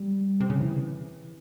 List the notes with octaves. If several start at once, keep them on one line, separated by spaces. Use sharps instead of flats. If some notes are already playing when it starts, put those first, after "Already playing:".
Already playing: G3
C3
C#3
E3